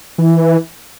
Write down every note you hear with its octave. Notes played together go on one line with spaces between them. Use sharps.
E3